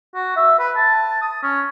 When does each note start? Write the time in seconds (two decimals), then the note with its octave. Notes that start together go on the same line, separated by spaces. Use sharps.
0.15 F#4
0.37 E5
0.59 B4
0.76 A5
1.22 D#6
1.43 C#4